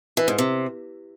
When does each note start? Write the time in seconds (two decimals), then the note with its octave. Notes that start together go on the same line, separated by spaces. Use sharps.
0.17 E3
0.28 G#2
0.38 C3